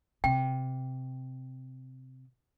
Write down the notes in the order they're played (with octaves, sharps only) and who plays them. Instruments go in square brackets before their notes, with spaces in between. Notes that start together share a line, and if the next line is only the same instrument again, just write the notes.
[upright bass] C3 [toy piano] G5